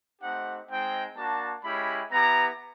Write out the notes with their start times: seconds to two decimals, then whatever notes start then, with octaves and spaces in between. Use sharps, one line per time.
0.22 A3 C4 D#4 G4 F#5
0.69 G#3 C4 D#4 G5
1.17 A#3 D4 F#4 A5
1.64 G#3 C#4 E4 G4 B5
2.11 B3 E4 G4 A#5